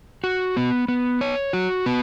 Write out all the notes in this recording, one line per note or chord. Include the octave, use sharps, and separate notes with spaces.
F#4
B3
B3
C#5
F#4
B3